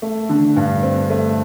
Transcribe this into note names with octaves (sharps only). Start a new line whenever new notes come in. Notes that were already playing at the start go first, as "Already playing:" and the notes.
A3
D3
G2
C4
A3